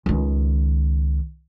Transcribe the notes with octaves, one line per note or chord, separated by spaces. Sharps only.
C#2 D#3